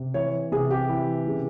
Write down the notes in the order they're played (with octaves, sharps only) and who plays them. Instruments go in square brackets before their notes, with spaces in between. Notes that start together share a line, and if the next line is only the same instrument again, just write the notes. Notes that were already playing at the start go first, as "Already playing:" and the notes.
Already playing: [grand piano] C3
E3 C#5
C3 G#4
G4
E3
C#3